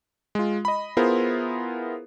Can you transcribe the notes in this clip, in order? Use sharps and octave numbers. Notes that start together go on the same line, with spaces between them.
G#3 F4
D#5 B5
B3 E4 F4 G#4 A#4 C5